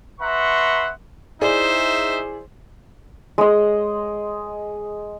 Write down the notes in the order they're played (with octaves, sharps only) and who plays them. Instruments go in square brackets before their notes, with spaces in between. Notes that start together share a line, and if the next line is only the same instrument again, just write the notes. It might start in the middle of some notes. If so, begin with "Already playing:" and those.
[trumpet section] B4 E5 F#5 A#5 C6 C#6
[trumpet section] D#4 E5 [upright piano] E4 G#4 D5 [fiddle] C5
[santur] G#3 D#5